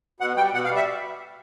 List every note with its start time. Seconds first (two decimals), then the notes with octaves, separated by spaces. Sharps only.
0.20 B2 F#5
0.37 G3 G5
0.53 B2 F#5
0.65 F5
0.70 G3
0.76 E5